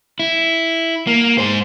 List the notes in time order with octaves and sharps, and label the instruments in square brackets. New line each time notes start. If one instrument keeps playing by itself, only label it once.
[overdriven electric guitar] E4
A#3
G#2 C5